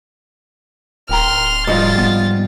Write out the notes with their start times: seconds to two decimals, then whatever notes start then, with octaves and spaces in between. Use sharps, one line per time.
1.09 D1 A#4 G5 A#5 C6 F6
1.67 G#2 F3 G3 F4 F#4 D#5 A6
1.98 B3